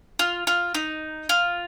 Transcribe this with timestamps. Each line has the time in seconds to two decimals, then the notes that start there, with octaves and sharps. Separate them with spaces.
0.19 F4
0.47 F4
0.74 D#4
1.29 F4